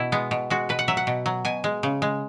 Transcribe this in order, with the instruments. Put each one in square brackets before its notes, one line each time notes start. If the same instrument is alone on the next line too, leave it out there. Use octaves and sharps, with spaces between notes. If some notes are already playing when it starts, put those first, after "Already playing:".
Already playing: [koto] B2 E4
G#3 B3
B2
G#3 F#4
B2 B4
F#5
F#3 E5
F#5
B2
F#3
B2 G#5
G#3
C#3
G#3